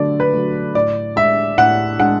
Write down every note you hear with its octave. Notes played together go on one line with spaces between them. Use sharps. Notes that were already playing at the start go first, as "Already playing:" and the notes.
Already playing: D3 F#3 A3 D5
B4
F#3 A3
A2 D5
G#3 D4 E5
A2 F#5
G#3 D4 F#5